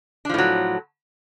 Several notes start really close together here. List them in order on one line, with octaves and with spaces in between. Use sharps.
D4 F3 A2 F#3